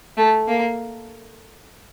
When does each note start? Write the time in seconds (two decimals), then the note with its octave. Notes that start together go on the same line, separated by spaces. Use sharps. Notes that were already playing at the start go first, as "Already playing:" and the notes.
0.17 A3
0.48 A#3